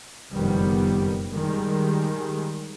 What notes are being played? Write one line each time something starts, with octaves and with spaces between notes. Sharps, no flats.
F#1 F2 B2 D#3 G3 B3
D#3 G3 G#3